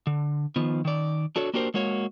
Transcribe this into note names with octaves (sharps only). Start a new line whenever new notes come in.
D3
D#3 F3 B3
D#3 D5
D4 F#4 A4 C#5
A#3 D4 F#4 G4 A#4 C5
G#3 A#3 F#4 C#5